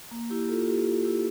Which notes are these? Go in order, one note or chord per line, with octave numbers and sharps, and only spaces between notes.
A#3
E4 G4
F4 A4
E4 G4
F4
E4 G4